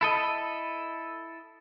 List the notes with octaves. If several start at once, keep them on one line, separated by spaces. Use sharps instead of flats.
E4 A4 D#5